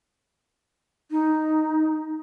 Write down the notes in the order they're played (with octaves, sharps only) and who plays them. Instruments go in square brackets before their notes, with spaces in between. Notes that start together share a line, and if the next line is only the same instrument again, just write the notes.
[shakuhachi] D#4